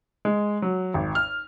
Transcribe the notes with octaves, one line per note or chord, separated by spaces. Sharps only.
G#3
F#3
G#1
F6